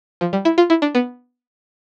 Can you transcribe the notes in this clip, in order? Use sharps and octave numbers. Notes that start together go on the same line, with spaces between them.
F3
G3
E4
F4
E4
D4
B3